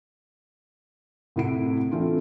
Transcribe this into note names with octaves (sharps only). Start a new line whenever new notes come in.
A2 C3 E4 F#5 D7
E3 A3 C4 D4 F4